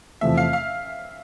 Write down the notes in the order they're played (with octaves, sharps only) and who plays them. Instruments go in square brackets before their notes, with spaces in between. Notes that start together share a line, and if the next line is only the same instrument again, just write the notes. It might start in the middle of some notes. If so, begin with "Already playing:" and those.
[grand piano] E2 C3 F3 A3 [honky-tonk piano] E5
[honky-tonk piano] F5
F5